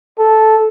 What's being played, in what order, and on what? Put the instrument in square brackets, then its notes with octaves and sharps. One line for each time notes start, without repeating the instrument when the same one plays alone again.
[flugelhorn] A4